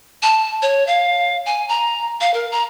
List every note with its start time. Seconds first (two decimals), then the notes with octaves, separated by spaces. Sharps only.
0.23 A5
0.62 C#5
0.87 F5
1.46 G#5
1.69 A#5
2.21 F5
2.34 A#4
2.52 A#5